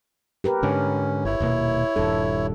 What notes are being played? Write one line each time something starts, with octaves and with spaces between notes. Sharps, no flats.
G4 A#4 B4
G#2 D3 C#4
G1 E4 C#5
D#1 B2 A#3
D#1 G2 A4